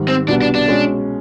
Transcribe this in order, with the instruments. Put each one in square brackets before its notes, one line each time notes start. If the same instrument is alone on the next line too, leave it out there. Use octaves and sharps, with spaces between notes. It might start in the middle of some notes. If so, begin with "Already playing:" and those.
Already playing: [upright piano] G#2 D#3 G3
[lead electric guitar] C4
[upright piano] C2 B2 G3 B3 [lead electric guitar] D4
[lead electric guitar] D4
D4
[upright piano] B2 G#3 C#4